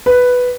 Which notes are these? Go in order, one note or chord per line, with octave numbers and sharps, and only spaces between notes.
B4